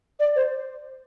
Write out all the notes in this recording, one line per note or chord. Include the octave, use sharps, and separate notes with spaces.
D5
C5